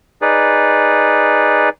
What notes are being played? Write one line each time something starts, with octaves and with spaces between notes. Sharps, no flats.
D#4 G#4 B4 D5